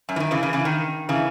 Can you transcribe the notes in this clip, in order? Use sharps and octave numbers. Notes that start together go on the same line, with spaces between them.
F#2
E3
D#3
C#3 E3
C#3 E3
C#3 E3
D#3
C#3 E3